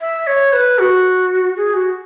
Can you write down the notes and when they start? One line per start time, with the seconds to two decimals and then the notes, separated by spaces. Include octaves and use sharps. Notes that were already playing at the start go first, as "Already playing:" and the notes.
0.01 E5
0.27 C#5
0.53 B4
0.79 F#4
1.57 G#4
1.74 F#4